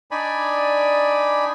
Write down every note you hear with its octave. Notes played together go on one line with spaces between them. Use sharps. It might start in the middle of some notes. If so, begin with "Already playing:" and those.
D4 D#4 D5 G#5 B5